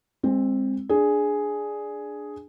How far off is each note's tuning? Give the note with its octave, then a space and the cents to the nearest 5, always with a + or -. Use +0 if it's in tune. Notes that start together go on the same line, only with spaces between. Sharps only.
G#3 -25 C4 +10
D4 +0 G#4 +5